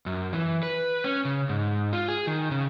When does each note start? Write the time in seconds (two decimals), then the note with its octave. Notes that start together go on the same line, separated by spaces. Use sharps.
0.06 F#2
0.33 E3
0.63 B4
1.04 C#4
1.25 C#3
1.49 G#2
1.93 F4
2.08 G#4
2.27 D#3
2.51 C#3